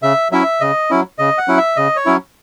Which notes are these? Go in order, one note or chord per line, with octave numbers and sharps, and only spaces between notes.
C#3 E5
F#3 C#4 E4 E5
C#3 D#5
F#3 C#4 E4
C#3 D#5
F#5
F#3 C#4 E4
E5
C#3 D#5
C#5
F#3 C#4 E4